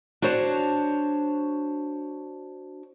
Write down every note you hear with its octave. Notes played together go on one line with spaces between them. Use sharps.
D4 F#4 C5 C#5 A5